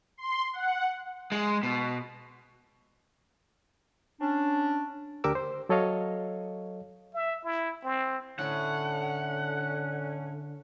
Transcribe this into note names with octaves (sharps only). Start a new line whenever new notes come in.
C6
F#5
G#3
B2
C#4 D4
D2 D4 G4 A#4 D6 E6
C5
F#3 A4 C#5 D#5 F5
E5
E4
C4
A2 D3 C#4 F#5